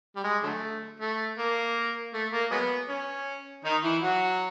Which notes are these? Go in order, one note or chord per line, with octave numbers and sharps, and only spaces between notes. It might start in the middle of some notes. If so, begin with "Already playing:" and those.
G3
G#3
D3 F#3 A3
A3
A#3
A3
A#3
F#3 G#3 B3
C#4
D#3 D#4
E3 E4
F#3 F#4